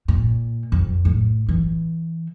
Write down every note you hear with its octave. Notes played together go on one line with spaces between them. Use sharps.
A#2
F2
A2
E3